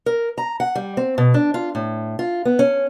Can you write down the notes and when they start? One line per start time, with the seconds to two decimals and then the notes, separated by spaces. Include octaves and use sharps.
0.06 A#4
0.38 A#5
0.60 F#5
0.75 G3
0.97 C4
1.18 B2
1.34 D4
1.54 F4
1.75 A2
2.19 F4
2.45 B3
2.59 C#4